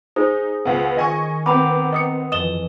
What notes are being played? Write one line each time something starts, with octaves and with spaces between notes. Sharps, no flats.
D#4 G#4 C5
C#2 B3
D#3 D#5 G#5 C#6
B3 C4 G5 A#5 B5 D6
D#5 D#6 C#7
F2 E3 D#5 D#6 E7 G7